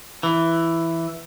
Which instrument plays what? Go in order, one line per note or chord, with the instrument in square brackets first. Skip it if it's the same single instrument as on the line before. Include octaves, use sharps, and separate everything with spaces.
[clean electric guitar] E3